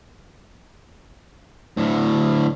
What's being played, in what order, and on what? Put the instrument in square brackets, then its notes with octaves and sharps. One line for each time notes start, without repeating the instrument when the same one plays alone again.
[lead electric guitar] D2 A2